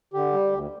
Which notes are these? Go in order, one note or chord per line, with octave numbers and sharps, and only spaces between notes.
D3 G4
G3
D2